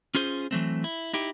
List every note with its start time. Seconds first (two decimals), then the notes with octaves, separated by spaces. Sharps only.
0.15 C#4 F4 G#4 C5
0.51 E3 F#3 A3 C4
0.84 E4
1.13 D#4 E4 G4